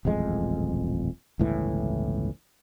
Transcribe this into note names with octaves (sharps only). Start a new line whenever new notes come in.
D#1 A1 F2 G#3
G1 C#2 A2 E3